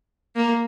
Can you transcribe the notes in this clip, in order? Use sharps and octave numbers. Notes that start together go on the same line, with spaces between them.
A#3